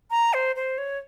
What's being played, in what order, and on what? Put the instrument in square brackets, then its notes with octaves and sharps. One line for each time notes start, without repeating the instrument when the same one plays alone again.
[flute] A#5
C5
C5
C#5